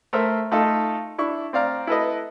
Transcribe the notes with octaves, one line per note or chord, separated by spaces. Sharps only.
A3 A#4 C5 E5
A3 D#4 F4 A4
D4 E4 C#6
C4 D5 F5 A#5
E4 A4 B4 D#5